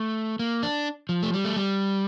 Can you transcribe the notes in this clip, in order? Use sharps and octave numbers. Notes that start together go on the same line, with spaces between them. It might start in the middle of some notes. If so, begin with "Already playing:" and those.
Already playing: A3
A#3
D4
F3
A3
G3
A3
G3